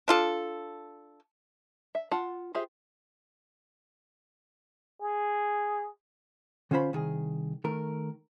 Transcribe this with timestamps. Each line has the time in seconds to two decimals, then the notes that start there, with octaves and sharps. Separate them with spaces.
0.08 D4 F4 A4
1.95 E5
2.11 F4 F#5 A5
2.55 F4 G4 G#4 C5 E5
5.01 G#4
6.71 D3 C#4 F4 C5 B5
6.93 C2 D#3 G#4
7.64 D#3 A3 A#4